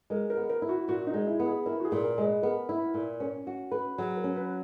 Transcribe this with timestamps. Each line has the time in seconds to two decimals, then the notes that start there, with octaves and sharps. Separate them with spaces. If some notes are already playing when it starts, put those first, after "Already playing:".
0.10 G#3 A#4
0.30 A#4
0.37 B3
0.50 A#4
0.62 E4
0.69 F#4
0.88 A#2 F#4
1.07 D#4
1.14 G#3
1.27 E4
1.40 B3
1.46 G#4
1.66 E4 A#4
1.80 F#4
1.85 G#4
1.92 A#2
2.04 A#4
2.18 G#3
2.23 B4
2.42 B3 A#4
2.69 E4
2.94 A#2
3.20 C#4 A#4
3.47 F#4
3.72 B4
3.98 F#3 G#4
4.17 A#4
4.24 C#4
4.36 B4